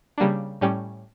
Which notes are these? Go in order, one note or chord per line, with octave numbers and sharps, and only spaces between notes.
C#3 G3 A#3 D4
A2 G3 C#4 G4